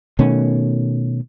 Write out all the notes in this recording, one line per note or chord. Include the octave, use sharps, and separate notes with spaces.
B2 D#3 A3 C#4